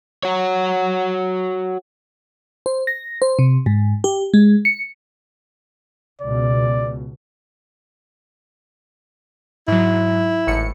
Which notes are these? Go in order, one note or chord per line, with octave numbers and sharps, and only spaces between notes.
F#4 C#5
C5
A#6
C5
C3
G#2
G4
G#3
C#7
C#2 B2 D5
G#2 F#3 E4
G#1 A2 C#7